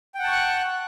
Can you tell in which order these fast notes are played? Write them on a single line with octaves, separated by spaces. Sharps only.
G5 F#5 A5 C#6 F#6